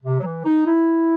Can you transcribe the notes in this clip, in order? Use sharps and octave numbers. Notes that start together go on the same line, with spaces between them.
C3
F#3
E3
D#4
E4